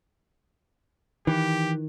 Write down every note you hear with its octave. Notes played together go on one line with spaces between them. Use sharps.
D#3 E3 G4